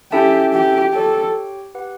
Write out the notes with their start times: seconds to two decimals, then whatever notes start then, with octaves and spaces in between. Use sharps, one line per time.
0.12 C#4 E4 G4 A4 E5 A5
0.53 G4
0.93 G4 A4 C#5 G5
1.75 G4 B4 F#5